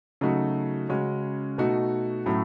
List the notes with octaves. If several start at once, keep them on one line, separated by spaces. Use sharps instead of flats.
C#3 F#3 A3 D#4 F#4
C#3 G#3 C#4 F#4
B2 A3 D#4 F#4
A2 F#3 A3 C#4